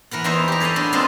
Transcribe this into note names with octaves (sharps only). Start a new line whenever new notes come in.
E3 A#4 B4 F#5
E2 E3 D#4 C5 E5 A#5
G4 A#5
G#4 A4 B4 C#5 D#5
F#3 A3 B3 D4
G#3 C4 F4 A4 B4 D#5